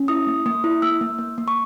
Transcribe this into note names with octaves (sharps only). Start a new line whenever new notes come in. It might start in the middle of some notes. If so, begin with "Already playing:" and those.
Already playing: C#4
E4 D#6
A#3
A#3 D#6
E4
A#3 E6
A#3
A#3
A#3
C#6